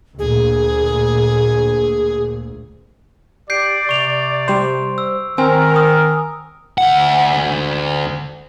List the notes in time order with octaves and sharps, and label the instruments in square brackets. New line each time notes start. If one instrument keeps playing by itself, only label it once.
[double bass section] D2 A#2 [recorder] G#4
[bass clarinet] G4 [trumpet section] D5 [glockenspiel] G6 C7 D7
[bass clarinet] C3 [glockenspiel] C#6 F7
[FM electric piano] G3 C5
[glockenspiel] E6
[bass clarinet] D#3 [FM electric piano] C4 [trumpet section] A#4 [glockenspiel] G#5
[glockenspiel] D#6
[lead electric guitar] D2 F#5